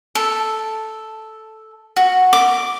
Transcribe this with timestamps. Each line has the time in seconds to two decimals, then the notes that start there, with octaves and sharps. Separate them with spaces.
0.15 A4
1.96 F#4
2.33 D6